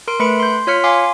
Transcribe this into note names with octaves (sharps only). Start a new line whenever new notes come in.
A#4 C6 D7
A3 B4 B5 C#7 D7
C6 G6
F4 C#5 C6 F6 B6 C#7
F5 G#5 C6 D6